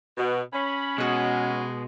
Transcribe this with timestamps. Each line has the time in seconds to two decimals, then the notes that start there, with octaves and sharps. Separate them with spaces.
0.17 B2
0.53 C#4 B5
0.98 B2 G#3 F#4 B4